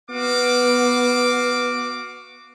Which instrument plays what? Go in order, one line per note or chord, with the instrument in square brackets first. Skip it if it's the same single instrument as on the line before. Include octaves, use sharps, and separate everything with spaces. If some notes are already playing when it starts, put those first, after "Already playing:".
[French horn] B3 [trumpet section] F#4 F5 D6